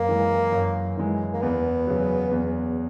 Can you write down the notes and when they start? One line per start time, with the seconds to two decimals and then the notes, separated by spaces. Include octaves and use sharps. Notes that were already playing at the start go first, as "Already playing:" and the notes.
Already playing: F#2 A#3
0.08 E3 G#3
0.52 F#2
0.97 E3 G#3
1.34 A#3
1.42 E2 B3
1.87 C#3 F#3
2.31 E2